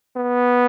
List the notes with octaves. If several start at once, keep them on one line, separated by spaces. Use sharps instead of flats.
B3